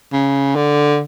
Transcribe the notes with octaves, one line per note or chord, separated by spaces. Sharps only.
C#3
D3